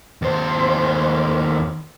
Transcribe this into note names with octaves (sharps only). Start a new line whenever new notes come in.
D#2 C5